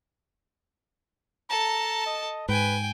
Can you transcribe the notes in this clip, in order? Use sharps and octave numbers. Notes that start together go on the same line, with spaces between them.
A4 A5 A#5
D#5
G#2 B4 G5 G#5